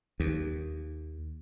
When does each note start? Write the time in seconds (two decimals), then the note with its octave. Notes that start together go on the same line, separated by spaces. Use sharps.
0.20 D#2